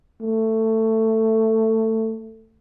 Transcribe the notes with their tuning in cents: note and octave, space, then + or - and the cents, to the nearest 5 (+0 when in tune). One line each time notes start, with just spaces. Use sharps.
A3 +15